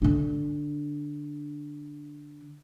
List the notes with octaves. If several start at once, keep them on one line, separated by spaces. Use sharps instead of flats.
D3 D4